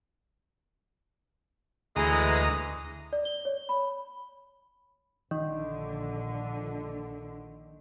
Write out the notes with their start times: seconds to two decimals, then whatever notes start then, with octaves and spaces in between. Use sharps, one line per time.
1.96 D2 E3 G#3 A#5 D#6
3.13 D5
3.25 G7
3.45 C#5
3.69 B5
5.31 A#1 D3 D#3